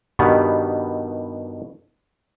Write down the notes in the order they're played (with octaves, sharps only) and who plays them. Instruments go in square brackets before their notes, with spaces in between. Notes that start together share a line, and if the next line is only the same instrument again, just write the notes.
[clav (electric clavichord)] G2 B2 D#3 G3 B3